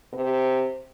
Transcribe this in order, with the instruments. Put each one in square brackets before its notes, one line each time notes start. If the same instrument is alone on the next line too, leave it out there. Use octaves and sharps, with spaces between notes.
[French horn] C3